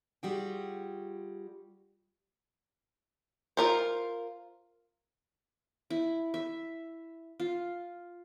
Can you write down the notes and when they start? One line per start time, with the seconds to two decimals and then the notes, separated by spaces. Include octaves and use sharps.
0.23 G3 F4 F#4 G#4 G5
3.57 F4 A#4 C5
5.90 E4
6.34 E5
7.40 F4